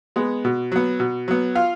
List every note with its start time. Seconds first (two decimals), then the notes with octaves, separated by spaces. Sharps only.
0.16 G#3 B3
0.45 B2
0.72 F#3 B3
1.00 B2
1.28 F#3 B3
1.55 F4 F5